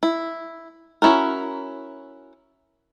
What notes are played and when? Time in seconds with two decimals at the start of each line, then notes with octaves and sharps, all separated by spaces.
0.03 E4
1.02 C#4 E4 F#4 A#4